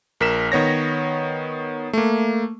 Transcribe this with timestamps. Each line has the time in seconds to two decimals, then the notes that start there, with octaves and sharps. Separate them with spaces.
0.20 A#1 A#4 B6 E7
0.52 D#3 B3 C#5 A#6
1.93 A3 A#3